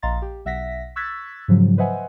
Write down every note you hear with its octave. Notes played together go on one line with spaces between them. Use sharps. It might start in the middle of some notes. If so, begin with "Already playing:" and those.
A#1 D#5 F5 A#5 C6 A6
G4
B1 E5 F#5 A#6 B6
C#6 E6 F#6 G#6 A6 B6
G#2 C#3 F3 F#3
B4 C5 D#5 E5 F#5 G#5